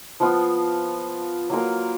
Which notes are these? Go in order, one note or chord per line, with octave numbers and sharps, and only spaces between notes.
F3 B3 F4
F#3 A#3 F4 A#4